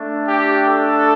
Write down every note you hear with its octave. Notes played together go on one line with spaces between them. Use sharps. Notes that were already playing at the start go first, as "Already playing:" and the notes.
Already playing: A3 D4
G4
A4